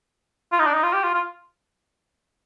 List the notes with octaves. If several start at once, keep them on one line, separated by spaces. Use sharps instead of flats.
F4
D#4
D4
D#4
F4
G4
F4
F4